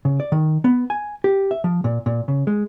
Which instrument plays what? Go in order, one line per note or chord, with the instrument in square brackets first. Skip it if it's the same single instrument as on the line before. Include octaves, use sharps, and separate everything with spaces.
[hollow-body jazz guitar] C#3
D5
D#3
B3
G#5
G4
E5
F3
A#2
A#2
C#3
G#3